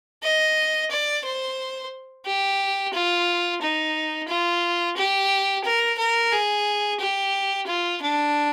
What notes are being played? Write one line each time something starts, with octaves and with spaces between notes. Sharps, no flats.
D#5
D5
C5
G4
F4
D#4
F4
G4
A#4
A#4
G#4
G4
F4
D4